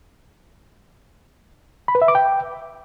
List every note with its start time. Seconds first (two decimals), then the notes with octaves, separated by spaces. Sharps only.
1.88 B5
1.95 B4
2.02 E5
2.08 D6
2.15 G5